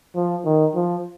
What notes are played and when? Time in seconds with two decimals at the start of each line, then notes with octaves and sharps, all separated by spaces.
0.16 F3
0.45 D#3
0.75 F3